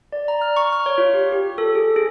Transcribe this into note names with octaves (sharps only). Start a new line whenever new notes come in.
D5
A#5
F6
C#6
F6
C#5
F4
G4
G4
A4
G#4
G#4